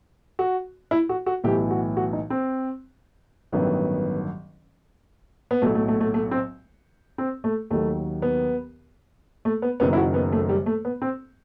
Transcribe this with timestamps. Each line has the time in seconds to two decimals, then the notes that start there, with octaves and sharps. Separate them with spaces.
0.39 F#4
0.91 E4
1.09 F#4
1.26 F#4
1.44 B1 A2 E3 G4
1.71 F#4
1.97 F#4
2.13 D#4
2.30 C4
3.52 A1 G2 D#3 F#3 B3
5.51 B3
5.62 B1 A2 F#3 A3
5.75 A3
5.88 A3
6.01 A3
6.14 A3
6.31 C4
7.18 C4
7.44 A3
7.70 D#2 D#3 F#3 A3
8.22 B3
9.45 A3
9.62 B3
9.80 F#1 F#2 D#3 F#3 B3
9.93 E4
9.97 F#4
10.14 B3
10.32 A3
10.49 G3
10.66 A3
10.85 B3
11.02 C4